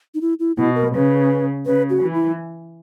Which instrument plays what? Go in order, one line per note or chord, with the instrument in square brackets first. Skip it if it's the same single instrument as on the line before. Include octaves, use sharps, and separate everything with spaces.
[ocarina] D#4
E4
E4
[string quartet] B2 [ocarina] E4
[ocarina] A#4
[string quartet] C#3 [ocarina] B4
[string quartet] C#3 [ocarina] B4
[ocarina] F#4
[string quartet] E3
[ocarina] E4